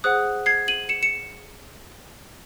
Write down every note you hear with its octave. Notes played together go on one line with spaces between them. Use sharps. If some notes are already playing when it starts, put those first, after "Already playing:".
G#4 C5 F#5 D#6 F#6
G#6 C7
D#7 F#7
C#7 E7
C#7 E7